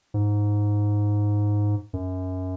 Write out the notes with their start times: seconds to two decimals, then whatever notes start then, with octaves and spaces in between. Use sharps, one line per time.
0.14 G#2
1.93 F#2